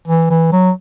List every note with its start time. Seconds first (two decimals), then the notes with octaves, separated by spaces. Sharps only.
0.08 E3
0.30 E3
0.52 F#3